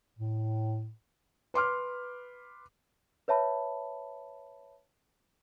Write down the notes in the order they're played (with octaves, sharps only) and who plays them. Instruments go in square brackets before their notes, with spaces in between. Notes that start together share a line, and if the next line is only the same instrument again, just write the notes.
[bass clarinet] A2
[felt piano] B4 C6 D6 F6
[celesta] B4 C#5 E5 A5 B5